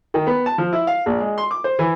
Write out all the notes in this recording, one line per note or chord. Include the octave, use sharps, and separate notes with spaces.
D#3
B3
A5
F3
E4
F5
A#1
G#3
C6
D6
C5
E3